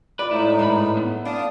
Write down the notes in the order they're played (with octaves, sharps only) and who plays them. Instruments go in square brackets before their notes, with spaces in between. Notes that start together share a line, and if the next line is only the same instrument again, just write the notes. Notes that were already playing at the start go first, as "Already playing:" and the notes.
[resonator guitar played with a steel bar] F4 D5 [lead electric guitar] B4
[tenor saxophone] A2 [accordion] G#3 A3 D#4 [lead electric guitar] E4
[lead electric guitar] G#2 B5 [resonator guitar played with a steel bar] B4
[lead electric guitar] B3
[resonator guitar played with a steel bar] D4 [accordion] F5 A5 D#6